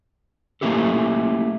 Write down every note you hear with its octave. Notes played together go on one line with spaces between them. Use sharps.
A3 A#3 C#4 E4 G4 A4